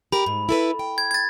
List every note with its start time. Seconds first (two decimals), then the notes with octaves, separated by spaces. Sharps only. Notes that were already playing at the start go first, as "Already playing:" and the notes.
0.12 G4 A#4 B5
0.26 G#2
0.49 E4 A4 B4
0.79 G5
0.98 G#6
1.11 G#6 A6